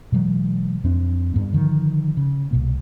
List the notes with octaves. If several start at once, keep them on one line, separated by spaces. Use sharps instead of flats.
B2 E3 F#3 G#3
F2 C4 D4
G2 B3
D3 D#3 F3
C#3
C2 B2 A#3